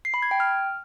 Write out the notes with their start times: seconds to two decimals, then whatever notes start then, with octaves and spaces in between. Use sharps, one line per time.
0.05 C7
0.14 B5
0.22 G#6
0.31 G5
0.40 F6